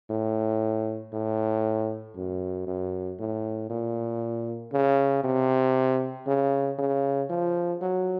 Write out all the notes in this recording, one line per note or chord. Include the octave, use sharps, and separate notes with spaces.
A2
A2
F#2
F#2
A2
A#2
C#3
C3
C#3
C#3
F3
F#3